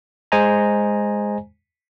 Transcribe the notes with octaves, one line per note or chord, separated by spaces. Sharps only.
G#3 C5 D#5 G#5 A#5